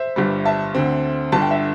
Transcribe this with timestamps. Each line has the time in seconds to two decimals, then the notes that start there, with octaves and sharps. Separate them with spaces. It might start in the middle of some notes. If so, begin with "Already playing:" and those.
Already playing: C5 E5
0.16 G1 G2 G3
0.45 E5 A5
0.75 D2 D3 C4
1.32 G1 G2 D3 A5
1.42 G5
1.51 E5